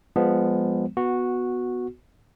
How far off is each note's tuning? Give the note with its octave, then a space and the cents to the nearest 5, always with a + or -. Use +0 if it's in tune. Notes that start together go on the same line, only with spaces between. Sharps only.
F3 +0 G#3 -25 B3 +0
B3 +0 F#4 -10